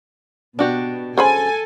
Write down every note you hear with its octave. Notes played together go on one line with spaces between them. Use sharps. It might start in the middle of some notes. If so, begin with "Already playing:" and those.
B2 D4 F#4 G4
C#3 A4 C5 G#5 B5